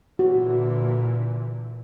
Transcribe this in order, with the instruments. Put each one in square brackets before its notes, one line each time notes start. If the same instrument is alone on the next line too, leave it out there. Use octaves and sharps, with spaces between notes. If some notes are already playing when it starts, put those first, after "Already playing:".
[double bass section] A#2 D3 E3 [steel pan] F#4